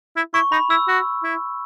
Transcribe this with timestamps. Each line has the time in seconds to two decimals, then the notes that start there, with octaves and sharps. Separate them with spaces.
0.16 E4
0.34 E4 C#6
0.52 D#4 B5
0.70 E4 E6
0.88 F#4
1.24 E4